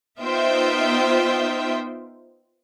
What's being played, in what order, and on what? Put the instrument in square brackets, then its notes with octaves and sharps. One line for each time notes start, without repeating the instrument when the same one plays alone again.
[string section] B3 D#4 F4 C5 E5 G5